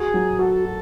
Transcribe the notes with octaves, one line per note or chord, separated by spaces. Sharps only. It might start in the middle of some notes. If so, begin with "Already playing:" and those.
Already playing: F#4 G#4
F#3
F#4 A4
F#4